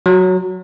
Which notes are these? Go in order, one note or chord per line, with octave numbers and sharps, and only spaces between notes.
F#3